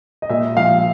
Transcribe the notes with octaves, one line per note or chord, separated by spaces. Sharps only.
D#5
A#2 E5
F3 F5